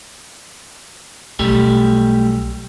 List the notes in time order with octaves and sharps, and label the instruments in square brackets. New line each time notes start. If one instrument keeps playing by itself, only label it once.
[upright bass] B1 F#3 [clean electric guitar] G3 A3 G4